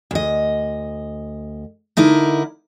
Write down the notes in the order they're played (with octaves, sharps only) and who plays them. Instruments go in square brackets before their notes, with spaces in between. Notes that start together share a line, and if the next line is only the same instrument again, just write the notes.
[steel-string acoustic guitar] D2 D#5
D3 D#4 E4 A#4